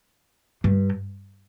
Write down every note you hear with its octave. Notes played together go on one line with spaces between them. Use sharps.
G2